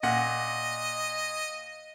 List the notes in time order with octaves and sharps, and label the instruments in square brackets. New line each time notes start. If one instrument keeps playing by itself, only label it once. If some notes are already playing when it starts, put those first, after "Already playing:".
[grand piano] A#2 F#5 A#6 [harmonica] D#5